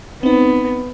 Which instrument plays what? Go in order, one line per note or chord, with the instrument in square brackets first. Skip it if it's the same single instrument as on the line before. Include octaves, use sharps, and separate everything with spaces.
[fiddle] B3 [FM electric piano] C4 D#4